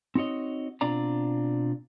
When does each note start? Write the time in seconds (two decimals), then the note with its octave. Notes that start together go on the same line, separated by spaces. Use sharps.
0.15 C4 D#4 F#4 C#5 D#5
0.81 B2 C4 D4 F4 D5 A#5